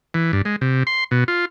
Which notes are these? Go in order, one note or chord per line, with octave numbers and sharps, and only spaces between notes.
E3
G2
G#3
C3
C6
B2
F4